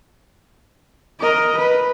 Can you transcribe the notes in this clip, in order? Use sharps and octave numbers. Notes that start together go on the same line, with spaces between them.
A#4 D#5
B4